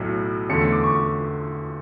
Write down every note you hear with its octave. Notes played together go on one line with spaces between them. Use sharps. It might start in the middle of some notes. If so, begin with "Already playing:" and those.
Already playing: B1 A2 F#3
E2 D3 A3 C#4 C#7
C#7
D6
C#6